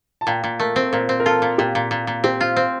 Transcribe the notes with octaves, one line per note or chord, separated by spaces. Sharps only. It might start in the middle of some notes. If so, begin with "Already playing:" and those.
A5
A#2 G5
A#2
A3 A#4
C4
A#2 A#4
C4
A#4
F4 A4
A#2
A#2 G4
A#2
A#2
A#2
C4 G4
F4
C4